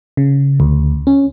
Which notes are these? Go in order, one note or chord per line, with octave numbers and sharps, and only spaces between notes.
C#3
D2
C#4